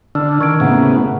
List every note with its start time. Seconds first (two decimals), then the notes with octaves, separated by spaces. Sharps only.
0.15 D3 D4 E6 F6
0.41 D#3 C#6 G#6 D7
0.60 A2 C#3 A#3 B3 F#5 A#5